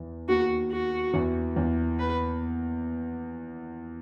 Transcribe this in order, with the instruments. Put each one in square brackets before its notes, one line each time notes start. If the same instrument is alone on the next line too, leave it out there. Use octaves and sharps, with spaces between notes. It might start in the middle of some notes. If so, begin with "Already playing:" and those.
Already playing: [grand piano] E2 E3
[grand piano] D#2 D#3 [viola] F#4
[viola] F#4
[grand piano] E2 E3
E2 E3
[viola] B4